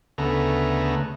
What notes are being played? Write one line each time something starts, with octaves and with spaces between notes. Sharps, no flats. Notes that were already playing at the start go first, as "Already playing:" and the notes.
D2 C#3 A3 B3 A#5